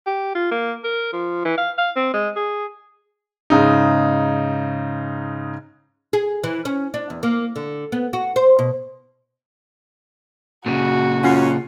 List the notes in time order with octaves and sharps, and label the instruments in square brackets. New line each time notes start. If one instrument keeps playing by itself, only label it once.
[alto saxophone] G4
F4
A#3
A#4
F3
E3
F5
F5
C4
G#3
G#4
[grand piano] G#2 C#3 D#4
[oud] G#4
E3
C#4
D4
E2
A#3
D3
B3
F#4
C5
B2
[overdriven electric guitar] A#2 C#3 [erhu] F#4
[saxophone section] F#2 C#4 [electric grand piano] F4 F#5 C7